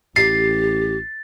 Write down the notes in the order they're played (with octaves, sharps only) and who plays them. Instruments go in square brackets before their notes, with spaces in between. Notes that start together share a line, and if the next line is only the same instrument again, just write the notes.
[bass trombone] A1 [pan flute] G4 [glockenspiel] A6 [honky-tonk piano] C7